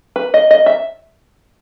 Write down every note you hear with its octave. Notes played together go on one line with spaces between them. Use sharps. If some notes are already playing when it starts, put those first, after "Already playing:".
B4
D#5
D#5
E5